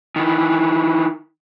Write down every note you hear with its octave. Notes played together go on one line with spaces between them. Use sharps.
D#3 E3